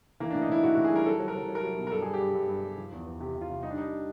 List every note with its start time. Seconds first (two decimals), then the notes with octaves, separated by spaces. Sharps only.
0.20 E3 A#3
0.31 A2 D4
0.42 D#4
0.49 A2 E4
0.63 A2 F#4
0.74 A2 F#4
0.84 G#4
0.92 G3 A#4
1.06 F#3 A4
1.20 F#3
1.28 A#4
1.35 F#3
1.48 F#3
1.55 A#4
1.64 F#3
1.77 B2
1.87 A#4
1.92 G2 A4
2.02 G3 G#4
2.14 G4
2.20 G2
2.34 G2
2.49 G2
2.64 G2
2.77 F3
2.92 E2
3.07 E2
3.20 C3 G4
3.35 C3
3.41 F4
3.49 C3
3.63 G3 D#4
3.70 D4
3.77 G3 D#4